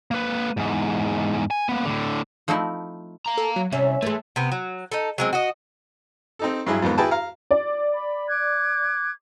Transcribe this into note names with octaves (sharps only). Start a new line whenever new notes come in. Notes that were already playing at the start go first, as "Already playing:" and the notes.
A#3 B4
E2 G#2
G#5
A#3 B3
A2 D3
F3 A3 C4 D#4 E4
F5 A#5
A4
F#3
C2 C#4 E5
E3 G#3 A3
C3 B3
F#3
D#4 A4
F#3 G#3 C4
F#4 D#5
C4 D#4 A4
G2 F#3 E4 G#4
F2 G#2 D#3 B3
E4 F#4 G#4 B4 G5 A5
F5 A#5
D5
B5
D6 F#6 G#6